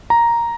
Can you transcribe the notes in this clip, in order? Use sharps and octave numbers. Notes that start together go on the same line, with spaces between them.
A#5